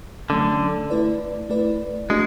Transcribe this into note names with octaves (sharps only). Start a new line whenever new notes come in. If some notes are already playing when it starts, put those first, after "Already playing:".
D3 F#3 A3 C#4
A3 E4 B4 D5
A3 E4 B4 D5
G#3 A3 D4 F#4